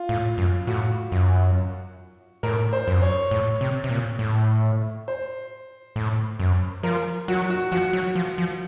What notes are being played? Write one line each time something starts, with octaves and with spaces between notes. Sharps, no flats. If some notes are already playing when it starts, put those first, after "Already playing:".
Already playing: F4
A2
F#2
A2 F#4
F#2
A2 A#4
C5
F#2
C#5
A2
C3
C3
A#2
A2
C5
A2
F#2
F3 A#4
F#3 F#4
F#4
F3 F#4
F#3
F3
F3